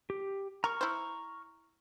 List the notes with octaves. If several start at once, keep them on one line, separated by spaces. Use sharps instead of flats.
G4
A#4 A#5 C#6 F6
E4 C5